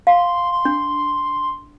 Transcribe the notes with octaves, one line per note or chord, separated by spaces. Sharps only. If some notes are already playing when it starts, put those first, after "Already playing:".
F5 C6
C6
D4